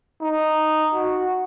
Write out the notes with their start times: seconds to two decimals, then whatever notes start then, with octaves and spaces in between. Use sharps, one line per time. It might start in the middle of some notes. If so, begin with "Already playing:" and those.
0.21 D#4
0.94 F#4